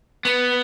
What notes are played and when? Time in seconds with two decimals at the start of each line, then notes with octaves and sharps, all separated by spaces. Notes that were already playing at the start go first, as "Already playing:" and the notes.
0.25 B3